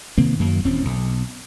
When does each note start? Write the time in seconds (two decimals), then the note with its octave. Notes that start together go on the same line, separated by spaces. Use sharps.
0.18 C3 D#3 A#3 C4
0.39 F#2 D#3 F#3 A#3
0.65 D#1 E2 C4 C#4
0.85 B1